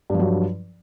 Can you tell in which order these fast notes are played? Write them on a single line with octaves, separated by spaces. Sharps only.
G2 F3 F#3